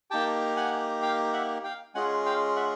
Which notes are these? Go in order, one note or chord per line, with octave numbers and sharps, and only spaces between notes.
A#3 D#4 G4 G5 A5
F#5 G#5
F5 G5
E5 F#5
F5 G5
G#3 C#4 F4 G#4 F#5 G#5
F5 G5
E5 F#5